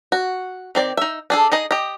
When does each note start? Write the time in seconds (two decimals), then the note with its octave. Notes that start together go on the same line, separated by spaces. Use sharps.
0.12 F#4
0.75 D#3 C4 D5
0.97 D#4 E5
1.30 D4 G#4 A4
1.52 D#4 G#4 D#5
1.71 G4 D#5